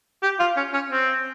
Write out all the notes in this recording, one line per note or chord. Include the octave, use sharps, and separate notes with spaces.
G4
F4
C#4
C#4
C4